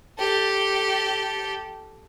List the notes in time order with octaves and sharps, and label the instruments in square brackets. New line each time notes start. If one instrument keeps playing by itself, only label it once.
[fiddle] G4 A4